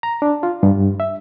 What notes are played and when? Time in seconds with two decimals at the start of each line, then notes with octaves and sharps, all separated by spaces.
0.03 A#5
0.22 D4
0.43 F4
0.63 G2
1.00 E5